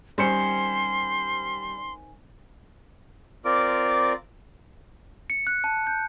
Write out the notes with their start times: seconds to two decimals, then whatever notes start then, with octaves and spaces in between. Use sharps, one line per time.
0.18 D#3 G3 C4 C#4 C5 C6 C#7
3.45 C4 F4 A#4 D5 D6
5.30 C#7
5.47 F#6
5.64 A5
5.87 G6